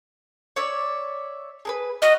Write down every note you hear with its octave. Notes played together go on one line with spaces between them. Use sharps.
C#5 D5 E5
G#4 A#4 B4
F#4 D#5 B5 F6